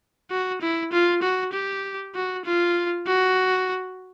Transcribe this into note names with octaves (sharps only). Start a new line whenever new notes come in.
F#4
E4
F4
F#4
G4
F#4
F4
F#4